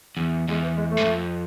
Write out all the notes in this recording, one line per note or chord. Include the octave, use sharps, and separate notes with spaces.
E2
E2 G#3
E3
G#3
A3
G#2
F2